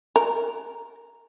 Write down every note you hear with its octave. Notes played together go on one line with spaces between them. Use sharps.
A#4